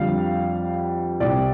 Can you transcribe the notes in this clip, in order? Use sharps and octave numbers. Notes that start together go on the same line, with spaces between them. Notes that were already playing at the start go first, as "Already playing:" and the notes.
Already playing: F2 D3 G3 F5
C2 C3 G3 D5